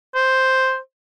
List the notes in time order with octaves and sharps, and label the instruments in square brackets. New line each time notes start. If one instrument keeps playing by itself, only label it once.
[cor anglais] C5